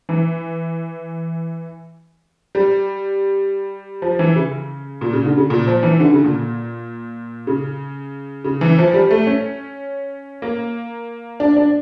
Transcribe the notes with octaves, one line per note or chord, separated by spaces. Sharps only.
E3
G3
F3
E3
C#3
A#2
C#3
D3
C#3
A#2
F3
E3
D3
C#3
A#2
C#3
C#3
E3
F3
G3
A3
C#4
A#3
D4
D4